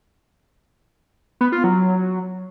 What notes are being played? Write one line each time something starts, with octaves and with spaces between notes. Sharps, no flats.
B3
F4
F#3